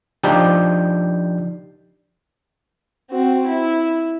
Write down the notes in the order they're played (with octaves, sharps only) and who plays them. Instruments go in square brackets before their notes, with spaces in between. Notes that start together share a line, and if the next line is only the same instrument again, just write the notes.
[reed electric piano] F3 D4 D#4 G4 D5 G6
[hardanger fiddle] C4 F#4
E4